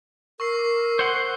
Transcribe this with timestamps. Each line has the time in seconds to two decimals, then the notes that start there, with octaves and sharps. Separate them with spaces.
0.40 A#4 C#6 E6 C7
0.59 D6
0.99 C5 F#5 C6